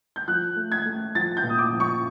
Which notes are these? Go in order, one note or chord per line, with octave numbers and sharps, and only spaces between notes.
G6
F3 F#6
A3
G#6
A3
F3 A6
G6
A#2
D#6
D6
F3
C#6